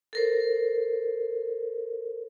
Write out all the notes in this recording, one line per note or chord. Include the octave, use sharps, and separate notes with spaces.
A4 A#4 C5